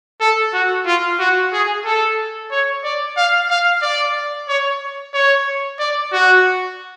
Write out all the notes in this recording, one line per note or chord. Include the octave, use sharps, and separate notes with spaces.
A4
F#4
F4
F#4
G#4
A4
C#5
D5
F5
F5
D5
C#5
C#5
D5
F#4